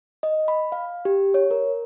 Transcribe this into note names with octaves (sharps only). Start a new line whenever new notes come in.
D#5
B5
F5
G4
C#5
A#4